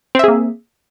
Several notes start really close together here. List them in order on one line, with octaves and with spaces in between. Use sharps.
C4 E5 G#4 A#3